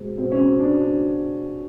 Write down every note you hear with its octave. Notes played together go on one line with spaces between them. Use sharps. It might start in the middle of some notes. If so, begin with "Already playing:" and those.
Already playing: B2 G#3 C4
B2 C4
C#4
C4
B3 D4
D4